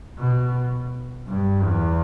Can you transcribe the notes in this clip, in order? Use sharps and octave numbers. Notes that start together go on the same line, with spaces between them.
B2
G2
E2